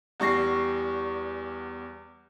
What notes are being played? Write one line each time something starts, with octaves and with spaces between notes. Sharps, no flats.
E2 G3 C#6 A#6 C7